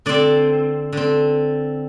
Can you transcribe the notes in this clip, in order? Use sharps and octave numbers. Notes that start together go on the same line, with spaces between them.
D3 C4 D5
D3 C4